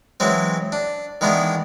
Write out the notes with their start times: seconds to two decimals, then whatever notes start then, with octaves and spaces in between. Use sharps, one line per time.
0.20 E3 F#3 G#3 C4
0.72 D4
1.21 D#3 E3 G#3 B3 D4